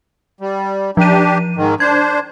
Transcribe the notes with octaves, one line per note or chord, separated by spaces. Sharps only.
G3
F3 D4 G4 D#7
G#2 D#3
D4 C5 G#6